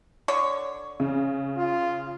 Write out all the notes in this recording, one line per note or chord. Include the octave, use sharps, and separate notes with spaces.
D3 C#5
C#3
F4